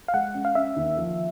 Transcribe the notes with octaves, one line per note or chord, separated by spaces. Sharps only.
F5
G#3 F#5
C#4
F5
C#4 E5
D#2
F3